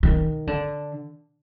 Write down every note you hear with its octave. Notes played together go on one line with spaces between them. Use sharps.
D#3
D3